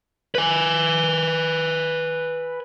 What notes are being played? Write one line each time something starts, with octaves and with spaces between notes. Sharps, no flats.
B4 G#5